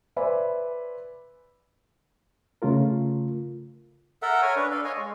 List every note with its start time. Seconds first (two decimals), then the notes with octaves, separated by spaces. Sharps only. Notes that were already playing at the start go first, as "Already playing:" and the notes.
0.16 B4 C5 D5 E5 G#5 B5
2.62 C#3 A3 F4 A#4
4.22 A4 A#4 E5 F#5
4.42 A#4 C#5 G#5
4.56 D4 B4
4.71 A4 D5 F5
4.85 C#5 D#5 F5 G#5
4.97 G#3